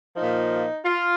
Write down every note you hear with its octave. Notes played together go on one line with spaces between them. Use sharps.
A#2 F3 D#4
F4